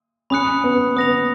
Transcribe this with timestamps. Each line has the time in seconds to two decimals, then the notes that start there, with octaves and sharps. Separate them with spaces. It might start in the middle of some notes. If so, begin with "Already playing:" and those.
0.30 C#4 B5 D#6 F#6 C#7
0.64 B3
0.97 B3 D#6 A#6 F7